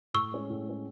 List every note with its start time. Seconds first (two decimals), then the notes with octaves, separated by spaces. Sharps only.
0.14 A2 C#6 E6
0.32 G#3 C#4
0.50 A2
0.66 G#3 C#4